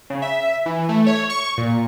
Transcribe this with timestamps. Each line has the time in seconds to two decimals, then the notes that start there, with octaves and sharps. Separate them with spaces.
0.10 C#3
0.22 E5
0.66 E3
0.89 A3
1.06 C#5
1.30 C#6
1.58 A#2